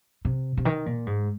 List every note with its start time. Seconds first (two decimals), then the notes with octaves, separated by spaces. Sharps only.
0.25 C3
0.57 C3
0.65 D#3
0.86 A#2
1.06 G#2